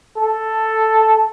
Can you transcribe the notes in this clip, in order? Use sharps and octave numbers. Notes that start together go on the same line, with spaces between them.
A4